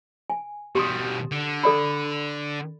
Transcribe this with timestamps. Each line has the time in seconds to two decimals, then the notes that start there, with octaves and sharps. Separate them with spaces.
0.30 G#5
0.75 B2 G3 G4 C6 D#6
1.31 D3
1.64 A4 D5 B5